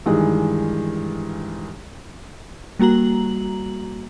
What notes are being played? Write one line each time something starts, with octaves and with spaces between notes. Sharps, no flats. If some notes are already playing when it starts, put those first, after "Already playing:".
G2 D#3 E3 G#3
G3 A#3 F#4 A#5 F#7